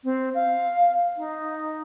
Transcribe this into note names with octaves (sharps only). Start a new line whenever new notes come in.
C4
F5
D#4